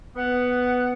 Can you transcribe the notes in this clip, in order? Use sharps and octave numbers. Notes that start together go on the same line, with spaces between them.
B3 F#5